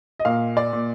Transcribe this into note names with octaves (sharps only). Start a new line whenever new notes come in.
D#5
A#2 F5
D5
A#2